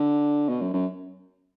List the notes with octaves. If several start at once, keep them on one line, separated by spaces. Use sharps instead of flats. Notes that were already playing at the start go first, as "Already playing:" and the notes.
Already playing: D3
B2
F#2
F#2